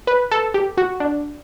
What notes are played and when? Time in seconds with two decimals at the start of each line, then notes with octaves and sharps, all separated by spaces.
0.07 B4
0.32 A4
0.54 G4
0.78 F#4
1.00 D4